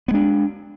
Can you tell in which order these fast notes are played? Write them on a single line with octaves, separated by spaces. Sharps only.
B3 G#3 D4